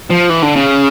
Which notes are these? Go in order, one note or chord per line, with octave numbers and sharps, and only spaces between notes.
F3
E3
D3
C#3